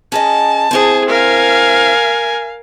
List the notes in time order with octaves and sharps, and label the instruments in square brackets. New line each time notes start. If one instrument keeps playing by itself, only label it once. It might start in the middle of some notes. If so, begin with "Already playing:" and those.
[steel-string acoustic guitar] C#4 G#4 D#5 [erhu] A5
[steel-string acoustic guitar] C4 E4 C5 [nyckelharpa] G#4 G#5
[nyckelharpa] A#4 G#5 [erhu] F5